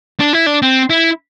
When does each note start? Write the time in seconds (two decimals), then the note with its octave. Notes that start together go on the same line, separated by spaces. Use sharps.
0.20 D4
0.33 E4
0.46 D4
0.62 C4
0.90 E4